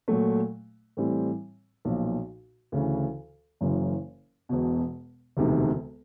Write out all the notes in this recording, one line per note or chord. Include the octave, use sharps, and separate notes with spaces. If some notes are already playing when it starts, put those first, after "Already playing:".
A#2 F#3 A3
A2 E3 G3 C4
B1 A#2 F3
D2 C#3 E3
F#1 F#2 C#3 E3
E1 E2 B2
E1 D2 C3 D#3